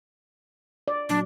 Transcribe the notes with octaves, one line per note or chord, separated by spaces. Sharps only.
D5
A#2 F#3 D4